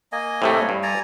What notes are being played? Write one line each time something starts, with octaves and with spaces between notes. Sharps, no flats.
A#3 D#5 G#5
A2 C3 A3
G2
D5 G#5 A#5